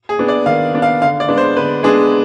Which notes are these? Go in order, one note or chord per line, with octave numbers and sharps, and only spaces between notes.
G#4
B3 D4
D5
D#3 F5
B3 D4
F5
D3 F5
D5
G#3 B3 D4
C5
D3 B4
G#3 B3 D4 G#4